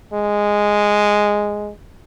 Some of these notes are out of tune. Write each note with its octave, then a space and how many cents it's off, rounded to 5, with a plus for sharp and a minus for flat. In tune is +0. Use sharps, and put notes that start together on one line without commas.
G#3 -5